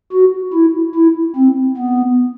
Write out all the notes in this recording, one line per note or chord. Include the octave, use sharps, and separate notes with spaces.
F#4
E4
E4
C4
B3